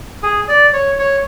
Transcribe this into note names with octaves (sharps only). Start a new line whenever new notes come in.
G#4
D5
C#5
C#5